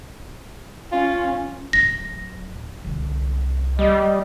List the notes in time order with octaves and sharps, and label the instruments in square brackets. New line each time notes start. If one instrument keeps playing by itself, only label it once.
[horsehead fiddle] C#4 [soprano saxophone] F4
[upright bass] D1 F#3 [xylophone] A#6
[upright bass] C2 D3
[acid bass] G3 [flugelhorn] D#5